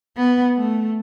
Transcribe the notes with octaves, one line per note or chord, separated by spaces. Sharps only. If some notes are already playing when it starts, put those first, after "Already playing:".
B3
A3